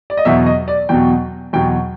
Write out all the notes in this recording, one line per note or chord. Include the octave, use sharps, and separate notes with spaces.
D5
D#5
E2 B2 F#3 E5
D#5
D5
E2 B2 F#3 G5
E2 B2 F#3 G5